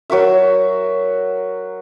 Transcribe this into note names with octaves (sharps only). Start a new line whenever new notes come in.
F#3 F#4 A#4 E5